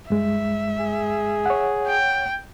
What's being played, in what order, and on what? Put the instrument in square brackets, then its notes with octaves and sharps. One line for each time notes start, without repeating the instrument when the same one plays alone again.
[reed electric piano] G2 G#3 [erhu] E5
[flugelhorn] G#4
[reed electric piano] C#5 F#5
[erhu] G5